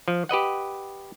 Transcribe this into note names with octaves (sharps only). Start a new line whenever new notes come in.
F3
G4 B4 D#5 F#5